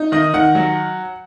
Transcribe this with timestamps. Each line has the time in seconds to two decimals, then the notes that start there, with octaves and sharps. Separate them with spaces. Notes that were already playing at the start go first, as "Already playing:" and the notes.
Already playing: D#4
0.12 D#3 D#5
0.34 D#3 F#5
0.55 F#3